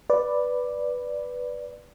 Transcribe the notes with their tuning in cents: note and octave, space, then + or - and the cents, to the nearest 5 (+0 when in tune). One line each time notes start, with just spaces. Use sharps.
B4 +0 D5 +0